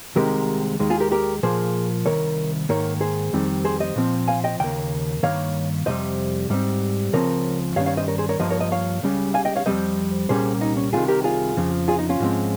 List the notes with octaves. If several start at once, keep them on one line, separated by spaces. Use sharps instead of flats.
C2 C3 D#3 G#3 G4 A#4
D#2 D#3 G#3
F4 G#4
G4 A#4
G4 A#4
A#2 F3 A#3 G#4 C5
C2 C3 D#3 A#4 C#5
G#2 D#3 A#3 A#4 C#5
G#4 C5
F2 D#3 G3 C4
G#4 C5
C5 D#5
A#2 F3 C4
F5 G#5
D#5 G5
D#2 C#3 A#3 G5
G2 D#3 A#3 C#5 F5
F2 C3 G3 C5 D#5
G#2 G3 C4
C#2 C#3 F3 C4 A#4 C#5
G2 D#3 G3 C#4 C#5 F5
C#5 F5
C5 D#5
A#4 C#5
G#4 C5
A#4 C#5
G2 F3 A#3 C5 D#5
A#4 C#5
C5 D#5
C#5 F5
C#2 C#3 G3 C#4
F5 G#5
D#5 G5
C#5 F5
F2 D#3 G3 C4 C5 D#5
C2 A#2 G3 A#3 C#4 G#4 C5
D#4
C#4
C2 C3 D#3 F4 G#4
G4 A#4
F4 G#4
F2 C#3 F3
F4 G#4
D#4
C#4 F4
G#2 F3 G#3 C4